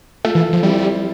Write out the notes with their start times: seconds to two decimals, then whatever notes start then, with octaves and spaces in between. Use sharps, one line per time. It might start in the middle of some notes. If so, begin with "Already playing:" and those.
0.25 A3 F4 A4
0.35 E3
0.53 F3
0.63 G3 C4 E4